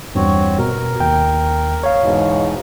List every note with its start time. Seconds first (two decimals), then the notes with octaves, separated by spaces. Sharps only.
0.15 E2 G2 C4 F#4 C#5
0.58 B2 A#4
1.00 D#2 G5
1.83 C#5 F5
2.02 E2 G#2 B2